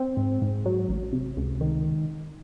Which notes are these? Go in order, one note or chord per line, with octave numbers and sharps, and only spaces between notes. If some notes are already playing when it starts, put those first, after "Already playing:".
Already playing: C4
G#2
G#2
F#3
A1
C3
C#2
D#3